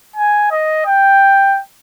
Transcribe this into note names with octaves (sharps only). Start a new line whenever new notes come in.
G#5
D#5
G5